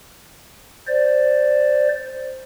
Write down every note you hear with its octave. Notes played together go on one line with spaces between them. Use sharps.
C5 D5